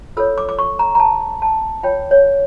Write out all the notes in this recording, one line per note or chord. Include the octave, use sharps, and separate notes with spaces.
F4 A4 C#5 E6
D6
D6
C#6
A#5
A#5
A5
A5
F4 C#5 G5
C#5